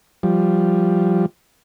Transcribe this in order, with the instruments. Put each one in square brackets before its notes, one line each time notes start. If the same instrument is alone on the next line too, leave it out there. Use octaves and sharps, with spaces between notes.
[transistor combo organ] F3 G3